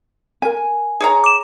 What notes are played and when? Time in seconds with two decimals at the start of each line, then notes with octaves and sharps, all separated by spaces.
0.42 A#4 G#5
1.00 G#4 C#5 A#5
1.24 D6 E7